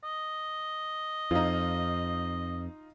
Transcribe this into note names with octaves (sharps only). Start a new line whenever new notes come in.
D#5
F2 D#4 F4